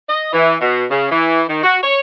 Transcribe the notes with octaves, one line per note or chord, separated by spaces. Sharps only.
D#5
E3
B2
C#3
E3
D#3
F#4
C#5